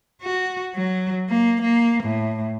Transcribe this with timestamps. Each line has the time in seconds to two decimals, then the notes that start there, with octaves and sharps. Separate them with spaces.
0.22 F#4
0.75 F#3
1.30 A#3
1.62 A#3
2.03 A2